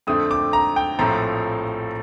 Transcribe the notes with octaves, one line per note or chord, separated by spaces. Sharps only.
F2 D3 A3 C4 D#6
D6
A#5
G5
A#1 A2 F3 A3 C4 A#5